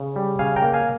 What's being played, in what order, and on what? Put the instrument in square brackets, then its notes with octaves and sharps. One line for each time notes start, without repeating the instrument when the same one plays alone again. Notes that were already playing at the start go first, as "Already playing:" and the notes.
Already playing: [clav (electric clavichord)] C#3
G3
C#3 F5 G#5
G5 A#5
A#3
F5 G#5